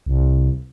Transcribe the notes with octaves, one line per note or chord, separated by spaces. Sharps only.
C2